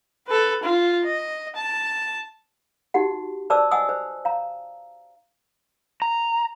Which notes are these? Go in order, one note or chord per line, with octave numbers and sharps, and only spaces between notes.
A4 B4
F4
D#5
A5
D#4 F#4 G4 F#5
B4 C5 D5 A5 D6 E6
D#5 F#5 G#5 D#6 E6
C5
F5 A#5
A#5